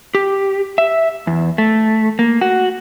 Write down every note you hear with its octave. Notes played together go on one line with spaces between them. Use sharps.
G4
E5
E2
A3
A#3
F#4